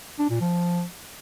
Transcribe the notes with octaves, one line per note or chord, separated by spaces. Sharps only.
D4
A#2
F3